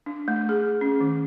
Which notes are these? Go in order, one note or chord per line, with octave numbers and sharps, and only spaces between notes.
D4
A3
G#4
C#4
D#3